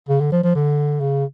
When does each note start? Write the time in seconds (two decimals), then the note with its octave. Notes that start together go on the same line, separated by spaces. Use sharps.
0.09 C#3
0.21 D3
0.32 F3
0.44 F3
0.55 D3
1.01 C#3